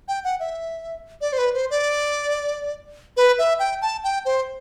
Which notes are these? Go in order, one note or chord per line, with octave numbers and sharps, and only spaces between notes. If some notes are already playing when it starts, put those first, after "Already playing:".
G5
F#5
E5
D5
C5
B4
C5
D5
B4
E5
G5
A5
G5
C5